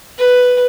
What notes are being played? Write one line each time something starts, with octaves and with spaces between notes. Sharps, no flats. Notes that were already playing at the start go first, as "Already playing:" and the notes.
B4